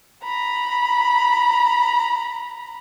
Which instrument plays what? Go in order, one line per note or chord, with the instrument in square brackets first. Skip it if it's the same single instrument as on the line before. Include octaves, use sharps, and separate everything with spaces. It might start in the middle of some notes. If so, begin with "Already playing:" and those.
[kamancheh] A#5 B5